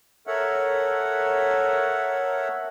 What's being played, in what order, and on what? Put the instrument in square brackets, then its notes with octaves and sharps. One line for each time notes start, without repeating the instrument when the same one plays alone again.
[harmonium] A4 A#4 C#5 E5 F#5